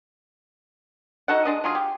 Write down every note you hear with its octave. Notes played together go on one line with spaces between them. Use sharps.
D#4 F#4 A4 F#5
G#3 D4 D#5
F#3 F4 G#4
G4